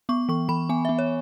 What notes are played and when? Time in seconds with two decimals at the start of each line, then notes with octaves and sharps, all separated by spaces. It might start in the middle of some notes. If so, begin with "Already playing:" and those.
0.09 B3 C#6
0.29 E3 C#6
0.49 E3 B5
0.69 B3 G#5
0.85 E5
0.89 B3
0.99 C#5